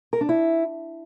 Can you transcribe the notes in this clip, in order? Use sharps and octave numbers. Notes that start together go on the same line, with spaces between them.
A#4
D4
E4